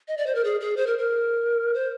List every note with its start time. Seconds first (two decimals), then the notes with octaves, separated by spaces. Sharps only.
0.08 D#5
0.17 D5
0.26 C5
0.35 A#4
0.44 G#4
0.61 G#4
0.77 C5
0.87 A#4
0.98 A#4
1.74 C5